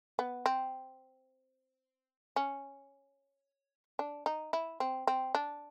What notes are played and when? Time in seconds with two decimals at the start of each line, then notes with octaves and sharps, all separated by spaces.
0.19 B3
0.46 C4
2.36 C#4
3.99 D4
4.26 D#4
4.53 E4
4.80 C4
5.07 C4
5.35 D4